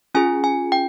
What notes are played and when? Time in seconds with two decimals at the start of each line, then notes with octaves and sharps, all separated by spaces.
0.15 C#4 F4 G#4 G#5
0.44 G#5
0.72 G5